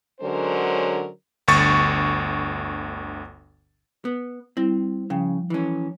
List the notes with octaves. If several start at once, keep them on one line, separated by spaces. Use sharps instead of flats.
D3 F#3 G#3 C#4 A#4 C5
G1 D2 C#6 A6
B3
G3 C4 E4
C#3 F3 G5
E3 C#4